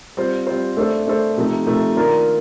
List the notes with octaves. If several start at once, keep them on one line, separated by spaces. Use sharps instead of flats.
G3 C4 F4 C5
G3 C4 F4 C5
A3 D4 A4 C5
A3 D4 A4 C5
C3 F3 A3 D#4
C3 F3 A3 D#4
D#3 A#3 D4 F4 A#4